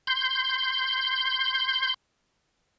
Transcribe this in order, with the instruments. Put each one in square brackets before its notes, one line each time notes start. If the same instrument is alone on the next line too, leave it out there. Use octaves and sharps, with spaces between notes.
[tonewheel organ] C6 G6